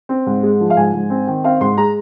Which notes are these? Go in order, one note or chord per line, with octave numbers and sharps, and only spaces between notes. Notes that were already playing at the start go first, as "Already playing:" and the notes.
C4
G#2
G#3
F3
F5
G#2 G#5
G#2
C4
D#3
C4 F5
G#2 C6
G#3 A#5